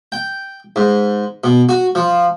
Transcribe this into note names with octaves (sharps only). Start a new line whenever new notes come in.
G5
G#2
B2
F#4
F3